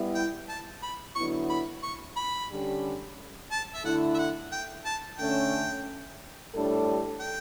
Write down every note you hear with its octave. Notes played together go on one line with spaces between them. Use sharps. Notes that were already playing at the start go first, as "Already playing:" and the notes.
Already playing: G3 B3 E4
G5
A5
B5
D3 F#3 B3 E4 C#6
B5
C#6
B5
D3 G3 C#4 G4
A5
E5
D3 A3 E4 F#5
E5
F#5
G5
A5
D3 A3 C#4 G5
A2 G3 D4 A4
G5